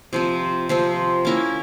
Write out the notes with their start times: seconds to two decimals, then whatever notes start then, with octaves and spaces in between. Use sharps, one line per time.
0.13 C3 F3 C4
0.69 C3 F3 C4
1.25 A#3 C#4 E4 A#4